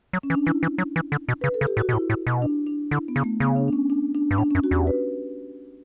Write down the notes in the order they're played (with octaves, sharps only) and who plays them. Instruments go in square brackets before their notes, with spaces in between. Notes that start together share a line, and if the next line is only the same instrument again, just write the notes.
[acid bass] F#3
[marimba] C#4
[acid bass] E3
[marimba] D4
[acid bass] E3 [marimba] E4
[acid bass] E3
F#3
E3
D3
B2
[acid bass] C#3 [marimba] B4
[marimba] A4
[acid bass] C#3
[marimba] G4
[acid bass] A2
[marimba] F#4
[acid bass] B2
[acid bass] A2 [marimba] E4
[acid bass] A2
B2
[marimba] D4
D4
[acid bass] D3 [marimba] E4
[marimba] B3
[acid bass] C#3
[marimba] A3
[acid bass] C#3 [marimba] B3
[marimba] D4
D4
C#4
D4
D4
[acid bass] G2
[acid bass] A2 [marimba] D4
[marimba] C#4
[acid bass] F#2
[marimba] F#4
[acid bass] E2 [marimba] G4
[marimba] B4